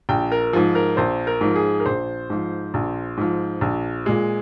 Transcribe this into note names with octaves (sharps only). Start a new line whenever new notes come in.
A#1 G5
A#4
G#2 F3
A#4
A#1 C5
A#4
G#2 F3
G#4
A#4
A#1 C5
G#2 F3
A#1
G#2 F3
A#1
A#2 G#3